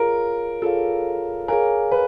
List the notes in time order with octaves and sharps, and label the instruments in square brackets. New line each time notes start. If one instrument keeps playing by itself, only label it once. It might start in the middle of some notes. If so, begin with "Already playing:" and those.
Already playing: [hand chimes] F4 G#4 C#5 F5 [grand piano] A#4
[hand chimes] F4 G#4 C#5 F5 [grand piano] A4
[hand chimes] G#4 C#5 F5 G#5 [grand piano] A#4
[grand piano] B4